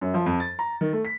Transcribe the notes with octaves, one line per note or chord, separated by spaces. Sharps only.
F#2
F3
F2
A6
A#5
D#3
A3
B6